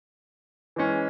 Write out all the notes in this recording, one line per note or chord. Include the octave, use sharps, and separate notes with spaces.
E3 G#3 C#4